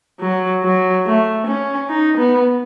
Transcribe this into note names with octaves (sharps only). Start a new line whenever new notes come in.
F#3
F#3
A3
C#4
D#4
B3